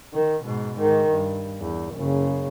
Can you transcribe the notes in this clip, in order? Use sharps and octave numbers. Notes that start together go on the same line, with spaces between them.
D#3
G#2 B2
G#2 D#3
G2
E2
F#1 C#3